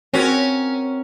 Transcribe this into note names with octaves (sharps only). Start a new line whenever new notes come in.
C4 C#4 F#4 A#4 C#5